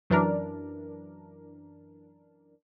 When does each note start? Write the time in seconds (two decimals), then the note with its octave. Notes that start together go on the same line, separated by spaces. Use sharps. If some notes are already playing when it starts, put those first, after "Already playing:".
0.10 F#2 E3 D4 A#4